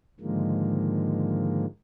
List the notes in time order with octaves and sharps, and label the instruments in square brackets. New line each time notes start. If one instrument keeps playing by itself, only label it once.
[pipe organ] G#2 D3 D#3 F3 G#3 A#3